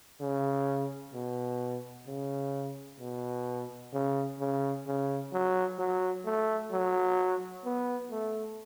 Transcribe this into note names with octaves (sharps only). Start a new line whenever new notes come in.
C#3
B2
C#3
B2
C#3
C#3
C#3
F#3
F#3
A3
F#3
B3
A3